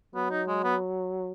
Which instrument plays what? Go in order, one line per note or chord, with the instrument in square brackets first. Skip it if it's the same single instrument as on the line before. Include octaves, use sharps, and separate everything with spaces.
[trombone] F#3 [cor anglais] B3
[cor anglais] D#4
G#3
B3